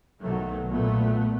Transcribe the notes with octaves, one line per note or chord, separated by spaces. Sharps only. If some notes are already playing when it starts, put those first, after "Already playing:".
B1 D#3 F#3 A3
A#2 A3 B3